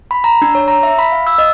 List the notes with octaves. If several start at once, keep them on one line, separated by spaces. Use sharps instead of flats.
B5
A#5
D4
C#5
A#5
E5
B5
F5
E6
D#5